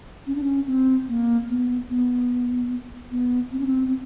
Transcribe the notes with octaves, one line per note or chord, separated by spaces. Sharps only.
C#4
D4
C#4
C4
A#3
B3
B3
B3
C4
C#4
C4
C4